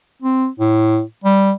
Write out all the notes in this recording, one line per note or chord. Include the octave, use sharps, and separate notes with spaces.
C4
A2
G3